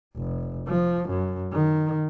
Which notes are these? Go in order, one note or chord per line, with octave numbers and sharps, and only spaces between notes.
F1
F3
F#2
D#3